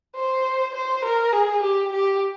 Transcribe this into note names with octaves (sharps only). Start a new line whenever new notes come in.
C5
C5
A#4
G#4
G4
G4